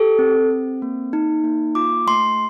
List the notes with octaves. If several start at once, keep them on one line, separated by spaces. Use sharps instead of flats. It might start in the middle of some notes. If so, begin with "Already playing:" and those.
Already playing: G4 A4
C4
C4
A#3
D#4
A#3
F4 D6
A3 C6